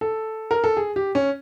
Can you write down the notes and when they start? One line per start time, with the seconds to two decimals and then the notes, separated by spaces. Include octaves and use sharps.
0.01 A4
0.51 A#4
0.64 A4
0.77 G#4
0.96 G4
1.15 C#4